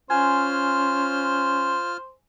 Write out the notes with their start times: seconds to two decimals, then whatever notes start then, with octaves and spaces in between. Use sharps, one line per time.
0.10 C#4 F4 C5 G#5 F6